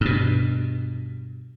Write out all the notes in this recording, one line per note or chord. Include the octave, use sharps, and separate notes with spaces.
G2 B2